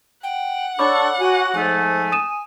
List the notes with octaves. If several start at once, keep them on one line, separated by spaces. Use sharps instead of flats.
F#5 G5
D4 A4 C#5 B5 C#6 D6
F#4 G#5
G#2 F3 A3 G#5
D#6 D#7 E7